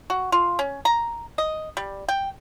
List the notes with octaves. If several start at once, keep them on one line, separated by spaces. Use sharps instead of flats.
F#4
F4
C#4
A#5
D#5
G3
G5